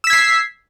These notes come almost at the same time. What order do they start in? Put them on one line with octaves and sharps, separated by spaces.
E6 B6 G#6 C7